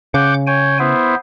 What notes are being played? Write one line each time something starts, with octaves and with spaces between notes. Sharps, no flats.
C#3 F#5 D6 G6
C#5 G5 G#5
B3 E4 C5